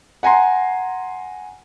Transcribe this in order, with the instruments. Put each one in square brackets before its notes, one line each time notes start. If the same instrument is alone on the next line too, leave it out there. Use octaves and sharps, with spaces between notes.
[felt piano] F#5 G#5 A#5 C6